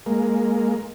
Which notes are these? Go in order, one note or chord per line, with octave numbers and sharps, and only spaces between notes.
G#3 A#3